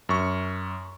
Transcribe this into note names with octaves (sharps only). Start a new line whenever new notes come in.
F#2 C#6